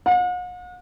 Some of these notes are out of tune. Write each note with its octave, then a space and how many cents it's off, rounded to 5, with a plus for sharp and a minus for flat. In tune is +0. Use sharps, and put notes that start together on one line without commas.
F#5 -45